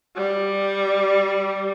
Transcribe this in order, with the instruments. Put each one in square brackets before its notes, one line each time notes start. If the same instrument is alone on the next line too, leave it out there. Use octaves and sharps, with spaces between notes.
[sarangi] G3